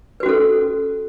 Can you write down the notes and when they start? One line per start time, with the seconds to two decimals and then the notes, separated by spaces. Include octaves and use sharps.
0.20 B4
0.23 F#4
0.26 C#4
0.29 A4